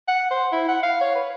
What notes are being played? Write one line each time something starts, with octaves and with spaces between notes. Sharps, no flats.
F#5
C5
E4
F#5
F5
C#5
B4